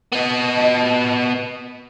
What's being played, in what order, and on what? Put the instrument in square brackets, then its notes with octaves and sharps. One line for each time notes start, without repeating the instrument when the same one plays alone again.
[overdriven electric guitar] B3 D#5